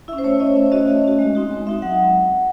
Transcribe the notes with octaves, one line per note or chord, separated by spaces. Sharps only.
C#4 E4 E5
C5
A3 C#5
C#4 E4 D#5
A3 E5
C#5
C#4 F#4 D#5
A3
C#4 F#4
G#3
C4 D#4 F#4
G#3
C4 D#4 F#4 E5
F#3 F#5